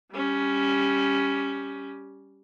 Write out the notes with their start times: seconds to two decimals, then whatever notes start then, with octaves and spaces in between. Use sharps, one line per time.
0.12 G3 C#4